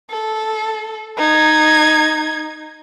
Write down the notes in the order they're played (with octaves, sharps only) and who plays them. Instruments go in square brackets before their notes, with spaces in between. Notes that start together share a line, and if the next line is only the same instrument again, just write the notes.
[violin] A4
D#4 G#6